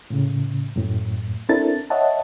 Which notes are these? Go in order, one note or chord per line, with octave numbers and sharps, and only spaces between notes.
A2 C#3
F#2 A2
C4 D4 E4 A4 A#4 A6
C#5 D#5 E5 F#5 A5